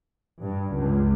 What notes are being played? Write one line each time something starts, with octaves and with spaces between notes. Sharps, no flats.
G2
C#2